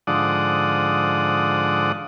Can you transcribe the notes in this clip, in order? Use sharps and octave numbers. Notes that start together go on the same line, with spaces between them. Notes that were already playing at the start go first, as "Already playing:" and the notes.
G#2 D3 F3 D5 F#5 D#6